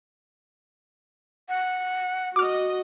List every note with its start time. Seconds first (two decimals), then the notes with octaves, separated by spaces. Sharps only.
1.49 F#5
2.36 F#4 D#5 D6 F6